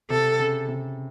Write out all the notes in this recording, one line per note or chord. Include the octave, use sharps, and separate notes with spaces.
C3 A4
C#3
C3